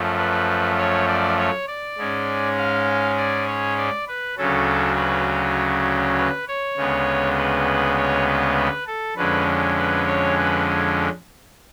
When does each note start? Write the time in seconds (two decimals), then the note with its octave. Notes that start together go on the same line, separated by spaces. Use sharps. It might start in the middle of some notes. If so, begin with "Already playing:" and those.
Already playing: F#2 F3 A3
0.17 B4
0.78 C#5
1.08 D5
1.38 C#5
1.68 D5
1.98 G#2 G#3 C#4
2.57 F5
3.18 D5
3.47 C#5
3.78 D5
4.08 B4
4.37 D2 C#3 F#3 C#4 A4
4.97 B4
6.17 B4
6.48 C#5
6.77 D2 C#3 G#3 B3
7.37 B4
7.97 C#5
8.27 B4
8.57 B4
8.87 A4
9.16 F2 D3 G#3 C#4 B4
9.77 B4
10.07 C#5
10.36 B4